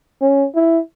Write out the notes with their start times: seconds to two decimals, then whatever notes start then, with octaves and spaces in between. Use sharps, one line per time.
0.21 C#4
0.55 E4